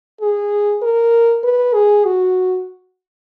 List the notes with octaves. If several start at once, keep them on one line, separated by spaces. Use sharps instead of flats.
G#4
A#4
B4
G#4
F#4